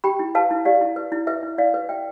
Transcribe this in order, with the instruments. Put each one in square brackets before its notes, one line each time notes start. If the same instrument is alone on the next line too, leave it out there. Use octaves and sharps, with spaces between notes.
[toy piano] G4 G5 B5
E4
B4 F5 A5
E4
G4 D5 F5
E4
B4
E4
B4 E5
E4
E4 D5 F5
B4
B4 E5 G5